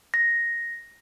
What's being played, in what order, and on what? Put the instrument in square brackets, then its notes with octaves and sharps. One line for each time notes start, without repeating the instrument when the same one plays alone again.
[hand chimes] A#6